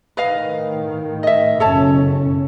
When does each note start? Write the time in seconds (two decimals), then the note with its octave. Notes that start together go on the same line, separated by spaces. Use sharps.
0.17 A2 D#3 B4 D#5 F5
1.23 D#5 E5
1.60 F#1 B2 C#4 A4 C#5 A5